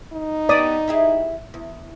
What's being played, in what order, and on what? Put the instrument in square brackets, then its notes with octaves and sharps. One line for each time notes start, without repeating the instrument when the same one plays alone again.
[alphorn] D#4
[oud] B3 G4 [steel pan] D5 D#6
[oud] E4 G4 G#4
E2